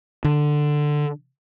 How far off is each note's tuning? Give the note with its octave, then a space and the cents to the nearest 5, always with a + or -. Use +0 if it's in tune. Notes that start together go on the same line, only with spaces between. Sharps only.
D3 +10